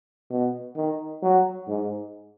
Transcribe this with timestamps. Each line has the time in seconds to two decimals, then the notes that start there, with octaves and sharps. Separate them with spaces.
0.30 B2
0.76 D#3
1.22 F#3
1.68 G#2